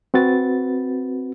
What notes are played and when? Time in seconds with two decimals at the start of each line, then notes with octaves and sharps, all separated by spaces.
0.14 C4 F#4 B4 A6